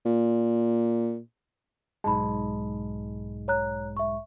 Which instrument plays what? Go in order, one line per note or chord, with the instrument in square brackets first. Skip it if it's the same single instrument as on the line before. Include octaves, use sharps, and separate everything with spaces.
[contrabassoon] A#2
[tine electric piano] B1 G#2 G#3 [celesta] A5 B5
[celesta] C#5 A#5 F#6
E5 C#6